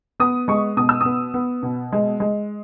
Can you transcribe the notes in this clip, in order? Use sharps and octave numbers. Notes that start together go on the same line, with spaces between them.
B3 D#6
G#3 C#6
B2 D#6
E6
B3 D#6
B3
B2
G#3
G#3